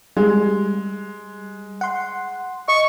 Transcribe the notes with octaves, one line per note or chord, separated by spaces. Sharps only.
G3 G#3
F#5 C6
D#5 C#6